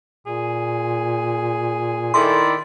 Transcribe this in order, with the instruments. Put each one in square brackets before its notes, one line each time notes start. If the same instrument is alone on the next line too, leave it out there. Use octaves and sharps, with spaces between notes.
[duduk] A#2 [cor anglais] G#4
[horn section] D#3 E4 D5 [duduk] A4 [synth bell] C6